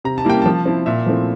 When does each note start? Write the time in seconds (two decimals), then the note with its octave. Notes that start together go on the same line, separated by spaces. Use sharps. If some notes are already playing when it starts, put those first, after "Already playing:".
0.04 C3 A#5
0.18 A5
0.25 G3 A#3 E4 G5
0.42 F3 A5
0.66 C4 E4
0.86 A#2 E5
1.06 F3 A3 C4 E4